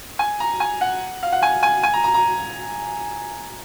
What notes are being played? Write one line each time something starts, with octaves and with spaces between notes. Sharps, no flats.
G#5
A#5
G#5
F#5
F5
F#5
G#5
G#5
G#5
A#5
A#5
A#5